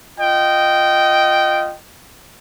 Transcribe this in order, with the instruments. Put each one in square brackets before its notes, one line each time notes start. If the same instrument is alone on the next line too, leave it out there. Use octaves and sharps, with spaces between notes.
[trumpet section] F4 D#5 G5